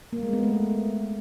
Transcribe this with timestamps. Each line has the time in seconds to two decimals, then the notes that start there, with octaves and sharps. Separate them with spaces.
0.13 A#3
0.23 G#3
0.33 B3
0.43 A3
0.53 A3